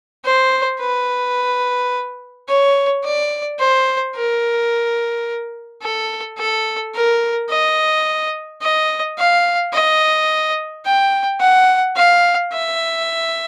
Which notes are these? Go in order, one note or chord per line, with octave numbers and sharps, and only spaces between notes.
C5
B4
C#5
D5
C5
A#4
A4
A4
A#4
D#5
D#5
F5
D#5
G5
F#5
F5
E5